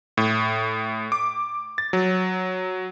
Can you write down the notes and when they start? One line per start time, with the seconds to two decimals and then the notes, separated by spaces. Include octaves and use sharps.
0.17 A2
1.12 D6
1.78 A6
1.93 F#3